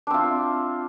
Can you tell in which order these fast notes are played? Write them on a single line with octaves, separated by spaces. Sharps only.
D4 C4 F4